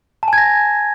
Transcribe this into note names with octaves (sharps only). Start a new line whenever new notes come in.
G#5 A5 G#6 A#6